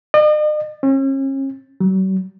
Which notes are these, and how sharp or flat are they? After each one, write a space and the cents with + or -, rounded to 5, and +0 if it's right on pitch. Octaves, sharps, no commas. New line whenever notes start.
D#5 -45
C#4 -40
F#3 +45